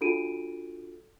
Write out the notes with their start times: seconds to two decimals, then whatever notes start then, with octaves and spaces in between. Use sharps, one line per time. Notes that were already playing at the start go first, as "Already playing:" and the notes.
0.01 D4 F4 F#4 A4 D7 D#7